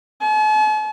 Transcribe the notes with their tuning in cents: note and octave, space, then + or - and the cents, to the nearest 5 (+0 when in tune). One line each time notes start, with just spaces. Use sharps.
A5 -45